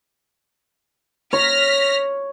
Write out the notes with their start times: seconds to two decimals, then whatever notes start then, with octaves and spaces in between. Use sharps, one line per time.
1.33 C#5 F6 A#6 B6